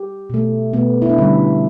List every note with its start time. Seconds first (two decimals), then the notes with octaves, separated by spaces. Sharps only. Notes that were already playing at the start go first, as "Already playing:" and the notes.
Already playing: G4
0.30 B2 A3
0.73 B2 A3 B3
1.02 E4
1.09 D4
1.18 D3 G3 C#4